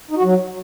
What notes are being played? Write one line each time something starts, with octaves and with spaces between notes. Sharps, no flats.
D#4
F#4
F#3